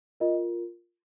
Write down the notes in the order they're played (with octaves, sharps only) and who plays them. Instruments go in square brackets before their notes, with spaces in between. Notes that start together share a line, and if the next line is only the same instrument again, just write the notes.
[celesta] F4 A#4 D#5